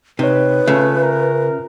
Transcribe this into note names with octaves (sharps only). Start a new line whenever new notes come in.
C3 D#4 B4 C#5
C#3 A3 C#4 F4 E5
A#4